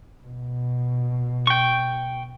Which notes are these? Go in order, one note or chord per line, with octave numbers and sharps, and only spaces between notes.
B2
G5 C#6